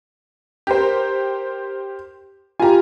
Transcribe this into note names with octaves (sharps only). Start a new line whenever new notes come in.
G4 A#4 C5
F4 G4 G#5 A#5